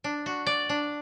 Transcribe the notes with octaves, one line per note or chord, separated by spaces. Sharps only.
D4
F#4
D5
D4